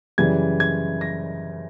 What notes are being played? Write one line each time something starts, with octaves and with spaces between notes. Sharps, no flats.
F#2 C#3 E3 G3 G#6
G#6
A#6